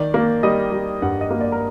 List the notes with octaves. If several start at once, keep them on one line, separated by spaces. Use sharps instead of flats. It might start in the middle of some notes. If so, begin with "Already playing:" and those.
Already playing: D#3 D5
A#3
G3 D#5
G3
G2 F#5
D#5
A#3
D5
A#4